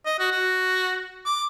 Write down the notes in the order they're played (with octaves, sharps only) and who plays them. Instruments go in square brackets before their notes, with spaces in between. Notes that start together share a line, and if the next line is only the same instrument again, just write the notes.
[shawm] D#5
F#4
F#4
D6